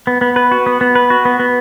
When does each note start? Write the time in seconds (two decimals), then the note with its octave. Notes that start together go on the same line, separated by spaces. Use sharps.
0.07 B3
0.21 B3
0.36 B4
0.52 F#4
0.66 B3
0.81 B3
0.95 B4
1.10 F#4
1.25 B3
1.40 B3